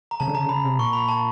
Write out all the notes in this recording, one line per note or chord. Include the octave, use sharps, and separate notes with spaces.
A#5
C#3 A5
D3
C#3 A#5
D3
C#3 B5
C3
A#2 C#6
B5
A5